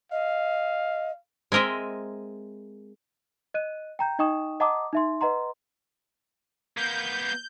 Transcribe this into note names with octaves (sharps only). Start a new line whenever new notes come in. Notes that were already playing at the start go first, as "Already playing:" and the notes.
D#5 F5
G#3 C4 A#4 D#5 E5
D#5 F#6 D#7
G5 A#5 G6
D#4 D#5 G5 C#6 D#6 E7
D#5 F#5 A5 A#5 D6 D#6
D#4 E5 C6
B4 D#5 F#5 A#5 C6
A#3 B3 G6